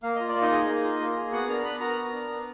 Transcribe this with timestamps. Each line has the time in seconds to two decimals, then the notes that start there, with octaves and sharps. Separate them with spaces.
0.03 A#3 F5
0.15 F4 D#5
0.29 D5
0.35 A#3
0.41 D#4 D#5
0.52 G#4
0.68 A#3
0.83 F4
1.00 A#3
1.17 G#4
1.32 B3 F#4 F#5
1.48 D4 A#4 A#5
1.64 B3 B4 B5
1.80 F#4 A#4 A#5
1.97 B3
2.13 D4
2.29 B3